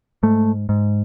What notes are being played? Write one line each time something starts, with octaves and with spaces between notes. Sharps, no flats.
G#2 A3
G#2